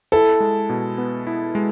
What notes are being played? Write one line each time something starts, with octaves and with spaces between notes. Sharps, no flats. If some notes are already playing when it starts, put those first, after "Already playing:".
E4 A4
G#3
B2
B3
E4
G#3